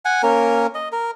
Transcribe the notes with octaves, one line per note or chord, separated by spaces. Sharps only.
F#5 G#5
A#3 C#4 A#4
D#5
A#4